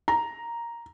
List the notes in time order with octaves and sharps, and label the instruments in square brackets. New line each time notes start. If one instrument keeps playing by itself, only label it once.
[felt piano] A#5